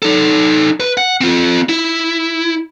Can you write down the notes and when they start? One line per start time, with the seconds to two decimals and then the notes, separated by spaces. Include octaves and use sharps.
0.02 D#4 A4
0.80 B4
0.97 F#5
1.21 C4 F4
1.69 E4